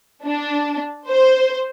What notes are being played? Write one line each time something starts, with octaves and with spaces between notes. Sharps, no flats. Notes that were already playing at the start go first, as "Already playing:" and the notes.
D4
C5